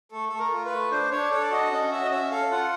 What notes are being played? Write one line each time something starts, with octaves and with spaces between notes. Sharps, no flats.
A3 A4
A3 A4
A#4
F4
B4
A3
D4 C5
D4 C#5
A4 C#5
D5
F#4 D#5
C#4 D#5
F#4 E5
D#5
C#4 E5
A4 F5
F4 F#5